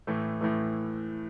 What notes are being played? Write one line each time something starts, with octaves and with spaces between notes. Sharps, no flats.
A2 E3 A3
A2 E3 A3